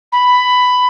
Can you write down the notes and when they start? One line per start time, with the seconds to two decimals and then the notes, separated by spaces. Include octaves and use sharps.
0.12 B5